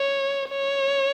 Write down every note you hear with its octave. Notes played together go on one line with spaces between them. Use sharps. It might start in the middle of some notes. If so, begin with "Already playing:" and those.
Already playing: C#5
C#5